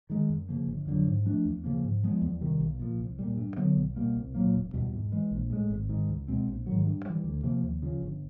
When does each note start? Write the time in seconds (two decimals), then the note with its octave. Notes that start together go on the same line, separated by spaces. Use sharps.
0.10 D#3 G#3
0.30 F#2
0.49 C#3 F3 A#3
0.67 G1
0.86 F2 D3 F#3
1.07 G#2
1.25 F3 A3 D4
1.45 E2
1.64 C#3 F3 A#3
1.84 G#2
2.03 F3 G#3 B3
2.22 E2
2.41 C3 D#3 G3
2.60 B1
2.79 A#2 F3
3.00 C2
3.19 A#2 G3
3.37 G2
3.57 D3 F#3 B3
3.77 B1
3.96 B2 G3 A#3
4.16 C2
4.35 A#2 F#3 A#3
4.54 E1
4.73 E2 B2 G3
4.93 G#2
5.12 E3 G#3
5.31 A#1
5.50 A2 E3 G#3
5.70 G#1
5.89 G#2 D#3
6.09 C#2
6.28 B2 G#3 C4
6.48 A#1
6.66 G#2 D#3 F#3
6.85 G2
7.05 E3 G3
7.24 D2
7.43 C3 F3 A#3
7.63 D#2
7.82 C#3 F3
8.02 G1